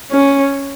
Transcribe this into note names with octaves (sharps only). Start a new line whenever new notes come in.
C#4